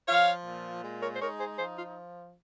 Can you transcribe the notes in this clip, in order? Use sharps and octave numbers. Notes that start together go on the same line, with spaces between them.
F3 C#5 F5
A#2
G#3
A#4 C#5
C5
D#4 A#4 C#5
G#4 C5
F3 G#4 C5
F4